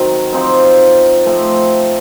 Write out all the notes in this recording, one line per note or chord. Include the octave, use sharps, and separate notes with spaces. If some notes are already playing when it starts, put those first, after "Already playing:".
Already playing: D#3 F#3 C4
F3 C4 D#4
F3 A3 C4